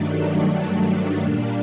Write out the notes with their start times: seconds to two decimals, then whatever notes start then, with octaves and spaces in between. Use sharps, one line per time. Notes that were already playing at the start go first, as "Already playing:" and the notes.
Already playing: G2 D#3 F#3 A3 D4
0.17 D4
1.23 A#2 G3 A#3